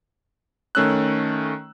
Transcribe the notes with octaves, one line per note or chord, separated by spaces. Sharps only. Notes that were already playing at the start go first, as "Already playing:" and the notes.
D#3 A3 C#4 E6 F#6